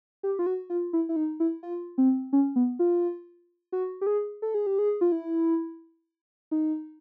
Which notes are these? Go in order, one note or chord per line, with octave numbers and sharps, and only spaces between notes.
G4
F4
F#4
F4
E4
E4
D#4
E4
F4
C4
C#4
B3
F4
F#4
G4
G#4
A4
G#4
G4
G#4
F4
E4
D#4